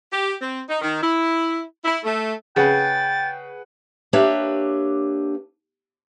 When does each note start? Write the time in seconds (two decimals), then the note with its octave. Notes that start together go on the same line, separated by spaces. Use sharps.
0.11 G4
0.41 C4
0.68 D#4
0.81 D#3
1.02 E4
1.84 E4
2.04 A3
2.56 C#3 G#4 B4 F#5 G5 A6
4.13 A#3 D4 G4 B4 C#5 E5